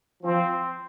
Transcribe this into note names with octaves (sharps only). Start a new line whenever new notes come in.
F3 C4